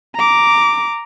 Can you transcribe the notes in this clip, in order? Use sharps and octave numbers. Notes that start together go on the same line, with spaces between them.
A#5 D6